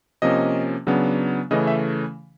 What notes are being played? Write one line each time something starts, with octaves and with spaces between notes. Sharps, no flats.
C3 F3 A#3 C#4 D#5
C#3 F#3 B3 D4
C#3 E3 A3 C#4 D#5
E5